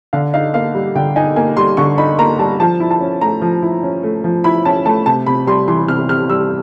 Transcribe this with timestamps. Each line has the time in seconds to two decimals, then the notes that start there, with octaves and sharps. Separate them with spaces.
0.13 D3 F5
0.34 D#4 F5
0.54 A#3 F5
0.75 G3
0.95 D3 G5
1.16 D#4 G#5
1.36 A#3 G#5
1.57 G3 C6
1.77 D3 C#6
1.98 D#4 B5
2.18 A#3 A#5
2.39 G3 A5
2.60 F3 A5
2.80 E4
2.91 A5
3.01 C#4
3.21 A3 A#5
3.42 F3
3.62 E4
3.83 C#4
4.03 A3
4.24 F3
4.44 E4 B5
4.65 C#4 A5
4.85 A3 A5
5.06 C3 A5
5.26 C3 B5
5.47 G3 C6
5.68 E3 C6
5.88 C3 F6
6.09 C3 F6
6.29 G3 E6